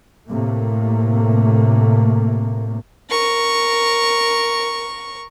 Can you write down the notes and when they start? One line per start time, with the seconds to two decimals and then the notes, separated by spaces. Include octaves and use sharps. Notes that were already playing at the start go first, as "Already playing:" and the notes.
0.29 A2 C3 A3 A#3
3.10 A#4 C#6